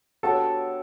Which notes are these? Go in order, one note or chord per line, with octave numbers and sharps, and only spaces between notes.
B3 D4 F#4 G4 A4 C#5